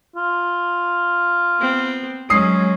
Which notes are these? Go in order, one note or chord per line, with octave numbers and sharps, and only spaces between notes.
F4
B3 C4
F#3 G#3 C#4 D#6 C7